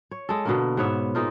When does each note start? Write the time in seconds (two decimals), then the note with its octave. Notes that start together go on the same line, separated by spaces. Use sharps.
0.11 C#5
0.29 G#3 A4
0.45 B2 D3 A#3
0.77 G#2 B3 C#5 E5
1.15 G#3 A#3 D#4 F4